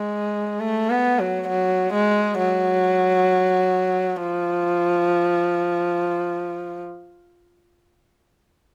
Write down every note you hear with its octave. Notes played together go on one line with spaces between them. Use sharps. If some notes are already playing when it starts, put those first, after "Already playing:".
Already playing: G#3
A3
B3
F#3
F#3
G#3
F#3
F3